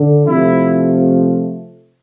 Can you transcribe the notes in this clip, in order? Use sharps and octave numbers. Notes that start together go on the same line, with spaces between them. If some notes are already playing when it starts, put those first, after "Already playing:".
Already playing: D3
C3 F3 A3 E4